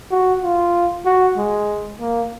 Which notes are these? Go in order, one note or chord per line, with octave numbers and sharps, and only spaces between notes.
F#4
F4
F#4
G#3
A#3